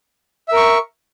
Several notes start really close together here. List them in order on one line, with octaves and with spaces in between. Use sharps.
E5 A#4 C#6